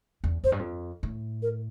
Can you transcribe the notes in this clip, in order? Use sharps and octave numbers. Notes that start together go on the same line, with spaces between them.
E2
F2 C5
G2
F2
A2
A#4